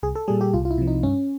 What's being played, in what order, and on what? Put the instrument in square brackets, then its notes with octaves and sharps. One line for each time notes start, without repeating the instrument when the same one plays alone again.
[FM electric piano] C2 G#4
A4
A#2 G3 G#4
G4
C2 F4
F4
E4
C3 F3
D#4
G2 C#4